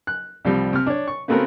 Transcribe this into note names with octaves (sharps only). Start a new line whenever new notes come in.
F#6
C2 F3 G3 C4
C3 F6
D4 C#5
C#6
C#3 A3 B3 C4 F#4 A#4